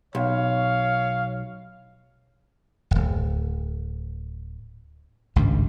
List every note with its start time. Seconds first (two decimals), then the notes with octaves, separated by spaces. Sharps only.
0.15 B1 C#5 F5
2.91 D1 G1
5.36 G#1 C#2 G2